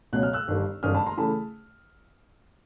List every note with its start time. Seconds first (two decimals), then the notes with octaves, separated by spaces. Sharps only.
0.13 C#2 B2 F#3 F#6
0.23 F6
0.33 E6 F#6
0.48 G1 G2 D#3
0.83 G1 F#2 D#3 D#6 F6
0.94 A5 B5
1.06 A#5 C6
1.17 C#3 E3 A3 A5 B5